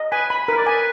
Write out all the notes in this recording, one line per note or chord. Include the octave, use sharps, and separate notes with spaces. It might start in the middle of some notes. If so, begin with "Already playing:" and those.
Already playing: D#5
B4 G#5
B5
A#4 B4
D5
B4 G#5